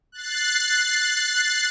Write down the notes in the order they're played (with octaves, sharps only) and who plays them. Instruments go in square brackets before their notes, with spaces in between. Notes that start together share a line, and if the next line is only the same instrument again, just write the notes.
[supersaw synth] F#6 A6 C7